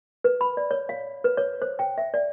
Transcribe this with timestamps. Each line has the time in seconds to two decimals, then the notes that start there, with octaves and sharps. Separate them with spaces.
0.24 B4
0.41 B5
0.57 D5
0.71 C#5
0.89 F5
1.24 B4
1.37 C#5
1.62 C5
1.79 G5
1.98 E5
2.14 D5